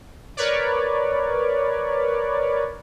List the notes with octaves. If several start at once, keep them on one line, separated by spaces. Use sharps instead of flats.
A#4 B4 C#5 D5